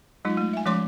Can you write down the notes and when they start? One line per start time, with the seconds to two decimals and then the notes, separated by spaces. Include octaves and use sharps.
0.25 F#3 G#3 D#4 F4
0.37 A3
0.53 E5 G#5
0.66 F3 G#3 C#4 C#5 C6 D6